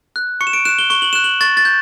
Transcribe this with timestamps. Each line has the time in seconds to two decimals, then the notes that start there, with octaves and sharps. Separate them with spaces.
0.16 F#6
0.41 C#6 C#7
0.47 E7
0.53 D7
0.65 F#6 E7
0.79 G7
0.90 C#6 G7
1.02 F#7
1.13 F#6 E7
1.24 F#7
1.41 C#6 A6
1.57 A6
1.65 G6